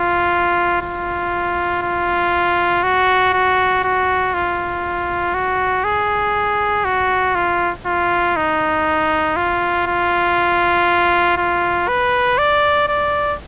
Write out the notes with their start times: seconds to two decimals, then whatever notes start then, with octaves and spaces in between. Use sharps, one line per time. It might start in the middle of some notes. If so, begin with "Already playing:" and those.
Already playing: F4
0.82 F4
1.82 F4
2.83 F#4
3.33 F#4
3.84 F#4
4.34 F4
5.34 F#4
5.84 G#4
6.85 F#4
7.35 F4
7.86 F4
8.36 D#4
9.36 F4
9.87 F4
11.38 F4
11.88 B4
12.38 D5
12.88 D5